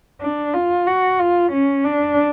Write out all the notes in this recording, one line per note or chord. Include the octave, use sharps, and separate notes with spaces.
D4
F4
F#4
F4
C#4
D4